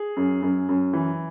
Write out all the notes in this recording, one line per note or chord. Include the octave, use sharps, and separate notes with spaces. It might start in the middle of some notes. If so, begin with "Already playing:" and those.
Already playing: G#4
F#2
F#2
F#2
E3